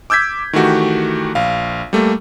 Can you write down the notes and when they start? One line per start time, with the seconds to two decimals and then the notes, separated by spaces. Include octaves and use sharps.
0.10 D6 E6 G6 G#6 B6
0.53 D#3 E3 A3 F#4 G4
1.35 A#1 F5
1.93 G3 A3 A#3